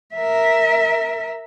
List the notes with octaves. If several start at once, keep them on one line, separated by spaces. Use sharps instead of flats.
A#4 E5